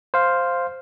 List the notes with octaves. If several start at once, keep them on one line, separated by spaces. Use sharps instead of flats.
C5 F5